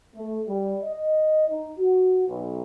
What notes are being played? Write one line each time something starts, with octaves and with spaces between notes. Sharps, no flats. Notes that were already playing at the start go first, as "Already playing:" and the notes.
A3
G3
D#5
D#4
F#4
B1